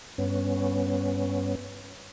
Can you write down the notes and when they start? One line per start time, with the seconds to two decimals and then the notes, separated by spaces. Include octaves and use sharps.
0.18 G2 B3 C#4